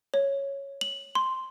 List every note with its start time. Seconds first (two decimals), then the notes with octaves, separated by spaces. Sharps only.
0.14 C#5
0.81 F#7
1.15 C6